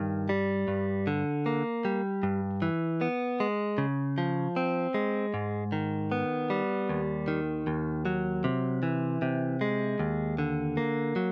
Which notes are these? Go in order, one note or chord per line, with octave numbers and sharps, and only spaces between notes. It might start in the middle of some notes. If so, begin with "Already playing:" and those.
Already playing: G2 D#3
G3
G2
D3
A#3
G3
G2
E3
B3
G#3
C#3
F3
C4
G#3
G#2
D#3
B3
G3
D#2
D#3
D#2
F#3
C3
E3
C3
G#3
D#2
D3
A#3
F#3